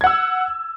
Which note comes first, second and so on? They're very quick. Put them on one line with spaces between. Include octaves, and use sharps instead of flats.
G#6 F#5 E6